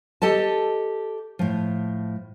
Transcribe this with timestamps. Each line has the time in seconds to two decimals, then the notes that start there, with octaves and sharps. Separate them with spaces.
0.22 G4 A4 D#5 A5
1.39 A2 F3